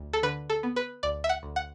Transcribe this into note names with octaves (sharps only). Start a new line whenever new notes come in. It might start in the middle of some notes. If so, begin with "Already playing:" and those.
Already playing: D2
A4
D3 B4
A4
B3
B4
D2 D5
E5
F#5
D2
F#5